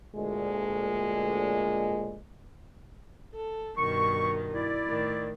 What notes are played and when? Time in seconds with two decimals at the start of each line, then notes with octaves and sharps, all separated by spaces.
0.15 D2 A#2 G#3
3.35 A4
3.77 G2 B2 D#3 C#6
4.53 E4 D5
4.86 A2 D#3